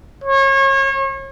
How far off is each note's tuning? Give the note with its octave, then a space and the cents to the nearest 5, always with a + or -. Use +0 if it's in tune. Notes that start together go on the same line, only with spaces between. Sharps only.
C#5 -35